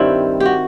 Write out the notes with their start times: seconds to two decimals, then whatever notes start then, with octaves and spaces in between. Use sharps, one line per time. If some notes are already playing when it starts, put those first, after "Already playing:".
Already playing: G2 D#3 G3 C4 E4
0.40 G4
0.46 F#4